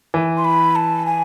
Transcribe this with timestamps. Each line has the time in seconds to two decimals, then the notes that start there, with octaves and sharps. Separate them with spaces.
0.14 E3
0.37 C6
0.45 B5
0.76 A5
1.06 G#5